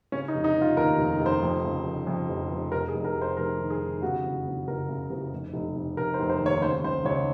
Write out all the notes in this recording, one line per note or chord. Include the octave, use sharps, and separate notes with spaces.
C#3 C#4
D#4
F1
D#4
F1
F4
D#2 A#4
F1
F1
C5
F2
C#3
F1
F2
F1
F1
F1 A#4
G#4
F1
A#4
F1
C5
F1 A#4
D#3
G#4
D#3
C#3 F#4
F#1
F#1
F#1 A#4
C#3
F#1
F1
F1
F1
F1 A#4
C5
F1
C5
D#2
C#5
C#3 C5
C#2 C5
C#2 C#5